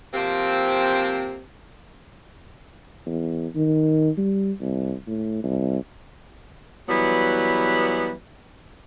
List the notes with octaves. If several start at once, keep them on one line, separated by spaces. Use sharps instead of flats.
C3 F3 A#3 C4
E2
D#3
G3
C2
A2
C2
E3 F#3 G3 B3